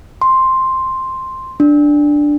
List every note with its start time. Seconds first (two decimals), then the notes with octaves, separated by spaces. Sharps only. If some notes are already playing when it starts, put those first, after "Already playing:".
0.22 C6
1.60 D4